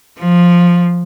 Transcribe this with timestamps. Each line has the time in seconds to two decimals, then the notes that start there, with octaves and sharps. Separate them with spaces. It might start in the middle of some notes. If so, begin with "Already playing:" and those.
0.19 F3